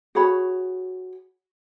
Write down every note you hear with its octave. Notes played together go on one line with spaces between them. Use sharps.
F#4 G#4 C#5 B5